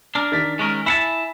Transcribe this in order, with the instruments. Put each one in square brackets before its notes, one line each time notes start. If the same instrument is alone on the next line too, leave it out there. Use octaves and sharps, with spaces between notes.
[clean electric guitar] D4 A#4
[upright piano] D#3 A6 B6
[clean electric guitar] G#3 C#4 A#4
[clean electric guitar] E4 F#5 A5 [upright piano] G#5 B6 E7